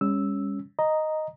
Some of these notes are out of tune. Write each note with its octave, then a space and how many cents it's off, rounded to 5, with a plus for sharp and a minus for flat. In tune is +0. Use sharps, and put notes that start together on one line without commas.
G3 +45 C#4 +0 E6 -5
D#5 +0 A#5 +0